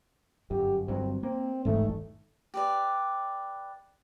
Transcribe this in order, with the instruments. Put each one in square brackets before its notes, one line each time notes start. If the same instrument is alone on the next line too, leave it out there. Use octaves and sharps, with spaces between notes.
[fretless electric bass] G1 F#2 [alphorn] G4
[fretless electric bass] G1 G2 F#3 [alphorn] C4
[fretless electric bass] A#3 [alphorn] C4
[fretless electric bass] E1 A1 D#3 [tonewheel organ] G#2 [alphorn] A3
[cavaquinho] G4 B4 D5